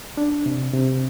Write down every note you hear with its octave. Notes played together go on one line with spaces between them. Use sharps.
D4
C3
C3